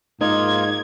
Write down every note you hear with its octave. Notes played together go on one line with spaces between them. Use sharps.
G#2 A#3 D#4 F4 G#6